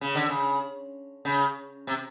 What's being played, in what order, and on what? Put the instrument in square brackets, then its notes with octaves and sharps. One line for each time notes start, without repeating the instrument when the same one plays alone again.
[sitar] C#3
D3
C#3
C#3
C3